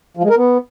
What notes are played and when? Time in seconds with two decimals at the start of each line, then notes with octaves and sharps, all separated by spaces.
0.17 F3
0.23 G#3
0.30 A#4
0.37 B3